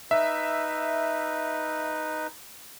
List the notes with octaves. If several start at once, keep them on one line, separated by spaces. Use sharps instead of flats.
D#4 B4 E5